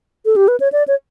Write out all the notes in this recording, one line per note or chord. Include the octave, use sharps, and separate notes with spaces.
A4
G4
B4
C#5
D5
C#5